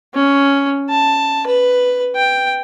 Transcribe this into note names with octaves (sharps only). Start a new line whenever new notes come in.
C#4
A5
B4
G5